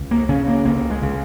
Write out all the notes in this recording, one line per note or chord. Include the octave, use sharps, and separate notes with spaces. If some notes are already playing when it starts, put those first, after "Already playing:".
Already playing: C#2
A#3
C#3 C#4
A#3
C#2 A#3
G#3
C#3